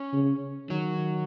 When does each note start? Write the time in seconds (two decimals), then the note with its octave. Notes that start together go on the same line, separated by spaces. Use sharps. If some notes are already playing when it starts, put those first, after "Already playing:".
Already playing: C#4
0.13 C#3
0.69 D#3 F#3